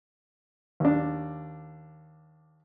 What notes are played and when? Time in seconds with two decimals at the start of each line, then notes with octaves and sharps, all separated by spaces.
0.80 D#2 D4